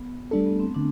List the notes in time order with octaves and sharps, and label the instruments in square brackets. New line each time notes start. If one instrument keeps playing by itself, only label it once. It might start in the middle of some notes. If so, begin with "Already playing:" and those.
Already playing: [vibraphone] B3
[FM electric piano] G3 D4 A4 [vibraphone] A3
[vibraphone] B3
C4
[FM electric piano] D3 [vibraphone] D4